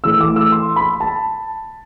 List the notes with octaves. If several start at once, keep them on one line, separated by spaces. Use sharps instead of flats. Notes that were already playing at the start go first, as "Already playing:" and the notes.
A2 E3 A3 E6
D6
E6
C6
B5
A5